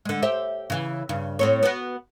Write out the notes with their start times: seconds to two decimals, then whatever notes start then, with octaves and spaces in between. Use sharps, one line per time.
0.05 D3 G#3
0.22 G4 C5 E5
0.70 C#3 E3
1.09 G2 C#3
1.39 A2 C4 C#5
1.63 B3 F#4